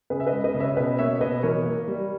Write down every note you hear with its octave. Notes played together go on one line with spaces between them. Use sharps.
C#3 G#4 B4
E5
B4 D#5
G#3
B4 D#5
C#3
C#5 E5
B2 B4 D#5
A#3 C#5 E5
B2 B4 D#5
E3 A#4 C#5
A#3
G3